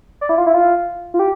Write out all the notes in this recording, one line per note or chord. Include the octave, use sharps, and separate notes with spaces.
D5
E4
F4
E4
F4
F4
G4